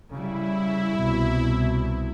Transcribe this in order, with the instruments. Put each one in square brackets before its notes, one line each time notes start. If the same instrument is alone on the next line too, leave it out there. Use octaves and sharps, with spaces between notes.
[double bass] C#3 G3 [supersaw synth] E4
[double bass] C2 [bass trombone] B2